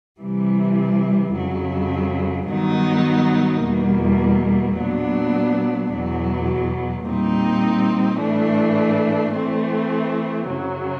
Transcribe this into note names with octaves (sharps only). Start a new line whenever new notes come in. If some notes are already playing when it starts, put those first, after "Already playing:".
C3 E3 G3
F2 C#3 F#3
G2 D#3 F#3 B3 D#4
E2 B2 G3 A#3
A#2 F#3 B3 D4
E2 B2 F#3
A#2 G3 C4 D#4
A2 E3 A3 D4
E3 A3 C4
F#2 C#3 F#3